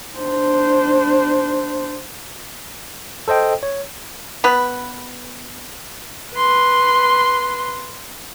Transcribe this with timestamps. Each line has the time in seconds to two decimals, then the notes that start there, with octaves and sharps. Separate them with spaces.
0.19 D4 C5
3.28 A4 C5 D#5 G5
3.63 C#5
4.44 B3 B4
6.34 B4 C6